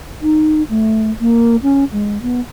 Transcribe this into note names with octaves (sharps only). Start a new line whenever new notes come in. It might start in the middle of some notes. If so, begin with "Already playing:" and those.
D#4
A3
A#3
C#4
G#3
B3